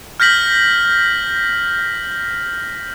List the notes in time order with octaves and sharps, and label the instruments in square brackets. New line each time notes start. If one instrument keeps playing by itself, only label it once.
[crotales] F6 G6 A#6 B6 F#7